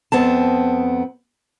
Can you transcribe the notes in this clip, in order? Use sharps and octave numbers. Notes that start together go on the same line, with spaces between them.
F2 B3 C4 A5